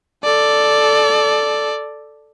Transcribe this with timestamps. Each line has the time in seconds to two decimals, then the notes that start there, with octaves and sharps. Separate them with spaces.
0.24 A4 D5